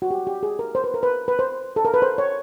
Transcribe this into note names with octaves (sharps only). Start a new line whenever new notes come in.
F#4
G4
G4
G#4
A#4
C5
B4
A#4
B4
B4
C5
A4
A#4
B4
C5
C#5